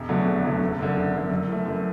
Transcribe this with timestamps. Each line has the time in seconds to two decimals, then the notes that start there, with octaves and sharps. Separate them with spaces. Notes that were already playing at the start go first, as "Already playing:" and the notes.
Already playing: E1
0.08 E2 D3 F#3 A3
0.26 E1
0.43 E2 D3 F#3 A3
0.61 F#1
0.79 F#2 D3
0.96 F#1
1.13 F#2 D3
1.30 F#2
1.48 E3 A3
1.66 F#2